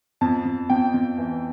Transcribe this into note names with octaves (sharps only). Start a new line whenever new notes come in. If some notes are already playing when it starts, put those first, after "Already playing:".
F2 A5
F2
F2 G5
F2
E3